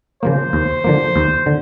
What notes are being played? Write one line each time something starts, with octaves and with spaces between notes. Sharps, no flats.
C#3 F3 A#3 C5
D#2
D3 F3 A#3
D#2
D3